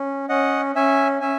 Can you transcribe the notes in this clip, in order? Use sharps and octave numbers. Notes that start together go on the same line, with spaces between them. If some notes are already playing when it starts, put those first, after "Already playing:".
Already playing: C#4
C#4 D#5 F#5
C#4 E5 G#5
C#4 E5 G#5